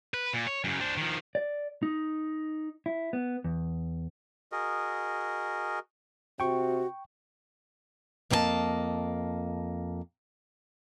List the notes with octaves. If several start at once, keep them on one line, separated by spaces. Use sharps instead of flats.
B4
A#2
C#5
F#2 C#3
D4 C5
D#3 F3
D5
D#4
E4
B3
E2
F#4 G#4 A#4 D#5
C3 F#4 G5 C#6
F2 A#3 C4 E4 D#5 A5